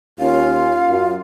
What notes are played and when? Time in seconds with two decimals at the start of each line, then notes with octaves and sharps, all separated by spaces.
0.19 D#2 C#4 F4 F5
0.89 F#2